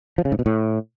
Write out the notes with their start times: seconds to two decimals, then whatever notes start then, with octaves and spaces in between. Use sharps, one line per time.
0.18 F3
0.25 C#3
0.32 G#2
0.39 B2
0.46 A2